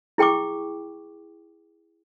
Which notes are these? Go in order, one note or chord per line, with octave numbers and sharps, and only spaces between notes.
E4 G#4 G5 C#6 D6